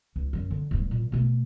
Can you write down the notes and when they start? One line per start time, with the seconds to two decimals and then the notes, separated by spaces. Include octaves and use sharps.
0.16 C#2
0.33 F#2 F#3
0.51 D3
0.71 D1 G2
0.91 A#2
1.12 B2 A3